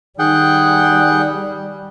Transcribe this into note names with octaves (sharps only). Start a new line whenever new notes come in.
D#3 G3 G#4 F#5 G5